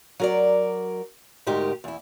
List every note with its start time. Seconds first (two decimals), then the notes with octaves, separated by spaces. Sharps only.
0.20 F#3 A#4 D5
1.47 D2 G#2 D#4 G4 A#4
1.84 E2 E4